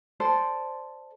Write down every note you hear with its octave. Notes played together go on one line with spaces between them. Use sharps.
A4 C5 D5